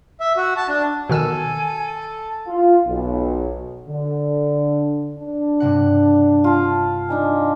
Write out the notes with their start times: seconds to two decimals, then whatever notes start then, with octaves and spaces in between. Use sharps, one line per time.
0.20 E5
0.37 F#4
0.57 A5
0.69 D4
1.09 B2 D#3 A4 G#5 E6
2.47 F4
2.86 B1
3.89 D3
5.19 D4
5.60 G2 C3 F#5
6.44 F4 A5
7.09 D4 D#4 G#5